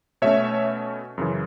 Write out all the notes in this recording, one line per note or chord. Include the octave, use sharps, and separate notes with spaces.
B2 A3 C#4 C#5 E5
F#2 C#3 E3